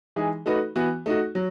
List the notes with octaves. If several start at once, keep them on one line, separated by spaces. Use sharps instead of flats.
E3 G#3 D#4 G#4
A3 D#4 F#4 B4
E3 B3 F#4
A3 D#4 F#4
F#3